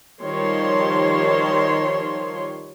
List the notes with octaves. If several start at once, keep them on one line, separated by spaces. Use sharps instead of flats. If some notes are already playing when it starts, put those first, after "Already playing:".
D#3 F3 G3 C#5 C6